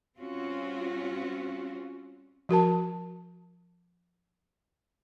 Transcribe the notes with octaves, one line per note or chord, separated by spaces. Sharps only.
G3 C4 C#4 F4 F#4
F3 F#4 A#4 A5